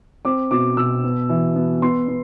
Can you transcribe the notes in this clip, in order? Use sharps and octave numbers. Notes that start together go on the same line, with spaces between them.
C4 D6
B2 D6
B2 E6
B3
E3
B3
B3 C6
B3